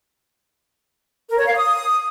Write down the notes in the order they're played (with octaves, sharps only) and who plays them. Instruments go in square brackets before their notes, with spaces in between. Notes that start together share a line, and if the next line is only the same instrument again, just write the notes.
[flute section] A#4
C#5
F5
D#6